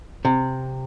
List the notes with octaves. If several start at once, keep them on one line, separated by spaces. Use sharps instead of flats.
C3